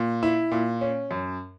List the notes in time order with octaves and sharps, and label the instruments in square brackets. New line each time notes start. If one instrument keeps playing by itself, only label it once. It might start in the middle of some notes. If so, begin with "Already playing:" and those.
Already playing: [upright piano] A#2
E4
A#2
C#4
F#2